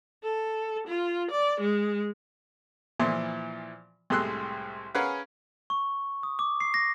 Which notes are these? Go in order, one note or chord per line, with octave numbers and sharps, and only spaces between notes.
A4
F4
D5
G#3
A#2 E3 F3 E4 C6
C2 A2 G#3 C6 E6 F#6
C#4 G#4 A#4 B4 F5 F#5
C#6
D#6
D6
C7
A#6